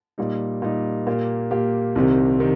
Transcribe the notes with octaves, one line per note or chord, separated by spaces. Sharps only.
A#2 G3 D#4
A#2 G3 D#4
A#2 A#3 G4
A#2 A#3 G4
C2 C3 D#3 C4 G4
C3 D#3 C4 G4